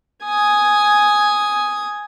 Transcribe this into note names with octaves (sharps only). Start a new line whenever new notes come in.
G#5 D#6